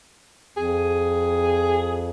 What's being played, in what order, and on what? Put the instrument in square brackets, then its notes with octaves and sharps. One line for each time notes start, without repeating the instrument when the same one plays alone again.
[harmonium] F2 [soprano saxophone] G#4